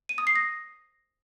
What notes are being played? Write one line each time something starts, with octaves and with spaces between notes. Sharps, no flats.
D#7
D#6
C7
A#6